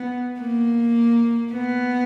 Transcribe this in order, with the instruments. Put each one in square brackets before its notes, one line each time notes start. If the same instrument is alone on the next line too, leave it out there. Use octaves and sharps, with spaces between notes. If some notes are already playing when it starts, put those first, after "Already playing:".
Already playing: [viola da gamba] B3
A#3
B3